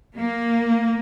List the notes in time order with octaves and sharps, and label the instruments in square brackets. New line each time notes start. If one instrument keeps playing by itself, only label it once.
[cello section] A#3